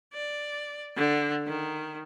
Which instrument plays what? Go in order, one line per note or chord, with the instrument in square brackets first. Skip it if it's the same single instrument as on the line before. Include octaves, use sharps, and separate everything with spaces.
[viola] D5
D3
D#3